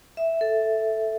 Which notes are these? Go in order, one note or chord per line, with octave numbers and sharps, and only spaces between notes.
E5
A4